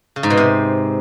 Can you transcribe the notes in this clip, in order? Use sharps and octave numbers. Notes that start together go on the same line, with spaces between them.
C#3
G#2
B2
C3